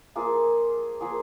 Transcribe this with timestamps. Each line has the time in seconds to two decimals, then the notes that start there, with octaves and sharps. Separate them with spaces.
0.16 F3 A#3 F4 G#4
1.01 F3 A#3 F4 G#4